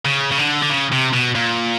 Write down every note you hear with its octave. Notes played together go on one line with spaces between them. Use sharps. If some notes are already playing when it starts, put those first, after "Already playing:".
C#3
C#3
D3
D3
C#3
C3
B2
A#2